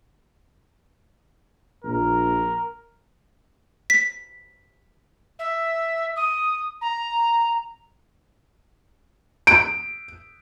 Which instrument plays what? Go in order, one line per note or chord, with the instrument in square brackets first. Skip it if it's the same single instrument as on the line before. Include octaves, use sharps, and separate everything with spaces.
[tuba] A#1 [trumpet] A#4
[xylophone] B6
[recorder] E5
D#6
A#5
[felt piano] D7